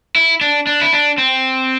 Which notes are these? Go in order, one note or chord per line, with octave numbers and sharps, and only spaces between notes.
E4
D4
D4
E4
D4
C4